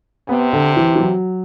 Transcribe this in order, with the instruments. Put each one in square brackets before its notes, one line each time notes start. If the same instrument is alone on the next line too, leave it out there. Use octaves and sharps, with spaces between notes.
[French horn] C3 [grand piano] B3
[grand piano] D3
E3
E3
F#3